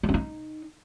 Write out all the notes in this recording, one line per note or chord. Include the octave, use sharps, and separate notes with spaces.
G#3
C#4
D#4